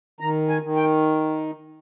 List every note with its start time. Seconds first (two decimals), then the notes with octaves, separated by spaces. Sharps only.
0.20 D#3 A#5
0.49 G#5
0.63 D#3
0.76 G5